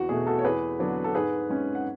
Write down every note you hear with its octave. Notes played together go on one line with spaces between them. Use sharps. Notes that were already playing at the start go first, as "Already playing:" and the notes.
Already playing: E2 F#4
B2 A3 G#4
F#4 A4
C#5
E2 G#4 B4
D3 F#3 B3 D4
A4
G#2 G#4 B4
G#3 C#4
F#5